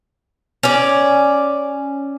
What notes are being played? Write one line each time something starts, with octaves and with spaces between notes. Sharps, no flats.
C#4 D5